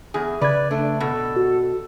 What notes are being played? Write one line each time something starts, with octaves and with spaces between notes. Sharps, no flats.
E2 G#4
C#3 B4 D5 G#6
A3 D4
B2 A4
F#4